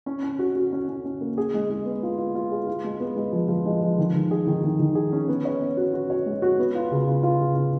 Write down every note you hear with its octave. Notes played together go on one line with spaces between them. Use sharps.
C#4
C#4
F#4
F#4
C#4
C#4
C#4
A#3
G#4
G#3
G#3
B3
F4
F4
F4
G#4
F4
G#3
B3
G#3
F3
F3
G#3
F3
D#3
D#3
G#4
D#3
D#3
D#3
G#4
C#4
B3
C#5
B3
F#4
F#4
C#5
G#3
F#4
B3
F4
C#3
F4
F4
C#3
F4